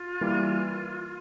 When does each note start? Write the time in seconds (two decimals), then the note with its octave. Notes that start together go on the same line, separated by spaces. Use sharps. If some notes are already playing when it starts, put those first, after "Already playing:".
Already playing: F4
0.21 E3 G3 A#3